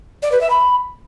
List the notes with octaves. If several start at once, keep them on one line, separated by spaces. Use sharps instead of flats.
D5
B4
E5
B5